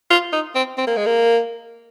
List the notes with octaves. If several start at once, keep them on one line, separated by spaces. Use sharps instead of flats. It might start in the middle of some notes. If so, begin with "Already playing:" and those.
F4
D#4
C4
C4
A#3
G#3
A#3